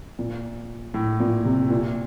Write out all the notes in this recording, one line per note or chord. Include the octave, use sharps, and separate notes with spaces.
A#2
A2
A#2
C3
A#2